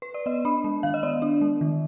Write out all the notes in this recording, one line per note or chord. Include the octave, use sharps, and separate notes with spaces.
B4
D5
B3 D#5
D4 B5
G#3
D#3 F5
D#5
B3 D5
D4
G#3
D#3